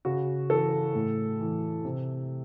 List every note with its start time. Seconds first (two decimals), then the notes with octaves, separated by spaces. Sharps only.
0.05 C#3 F#4
0.50 E3 A4
0.95 A2
1.40 E3
1.85 C3